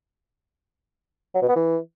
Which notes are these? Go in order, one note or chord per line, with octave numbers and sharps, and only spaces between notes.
F#3
B2
B3
E3